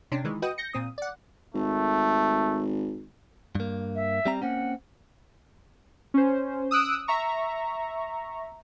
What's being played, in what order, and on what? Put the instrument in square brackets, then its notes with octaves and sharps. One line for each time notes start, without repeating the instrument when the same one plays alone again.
[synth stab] C3 C#4 D4
D#3 E3 G#3
F#4 B4 D#5 G5 D#6
G6 A#6 C#7
A#2 C4 D#6
D5 F#5
[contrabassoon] G#1 [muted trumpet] A3
[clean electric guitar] G2 A#3
[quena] E5
[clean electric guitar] G3 C4 A#5
[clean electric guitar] A#3 C4 C#4 [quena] F#5
[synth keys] C#4 C5
D#6 E6 F#6 D7
E5 A#5 C#6